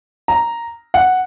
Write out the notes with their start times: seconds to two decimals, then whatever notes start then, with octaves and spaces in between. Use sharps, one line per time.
0.28 A#5
0.94 F#5